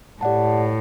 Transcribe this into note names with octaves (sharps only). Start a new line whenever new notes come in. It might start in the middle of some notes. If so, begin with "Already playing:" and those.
A2 G4 D5 F#5 A5